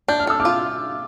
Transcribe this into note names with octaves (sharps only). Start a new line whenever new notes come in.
D4 G6
F6
A4 E6
D6 F6
F4